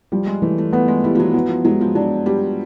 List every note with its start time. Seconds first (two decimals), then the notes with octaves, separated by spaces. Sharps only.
0.12 F3 G3
0.27 G#3
0.42 E3 A3
0.58 A3
0.73 A3 B3
0.88 G#3
1.03 G3 E4
1.15 F3
1.20 F#3
1.34 F#3 B3
1.49 F3
1.65 F#3 G#3
1.81 F3
1.95 F#3 D4
2.26 G3 G4